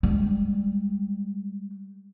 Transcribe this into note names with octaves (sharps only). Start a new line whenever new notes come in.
G3 G#3